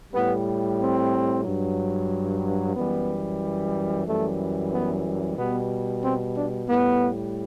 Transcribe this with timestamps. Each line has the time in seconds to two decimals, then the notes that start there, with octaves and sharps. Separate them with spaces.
0.13 A2 G3 B3
0.79 C4
1.44 G2 F#3
2.75 F#2 E3 G3 B3
4.07 F#2 E3 G3 A3
4.71 B3
5.37 B2 G3 B3
6.03 C4
6.36 D4
6.68 A2 G3 B3